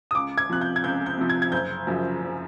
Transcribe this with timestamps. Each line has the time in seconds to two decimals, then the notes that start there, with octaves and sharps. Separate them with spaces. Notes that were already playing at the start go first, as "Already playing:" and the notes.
0.11 D#6
0.15 C#2 D6
0.38 G#6
0.50 C3 F3 F#6
0.61 G6
0.76 G#6
0.84 C#2 G6
1.06 G6
1.17 C3 F3
1.29 G#6
1.42 G#6
1.52 F#1 G6
1.87 F#2 C#3 F3
2.22 F#1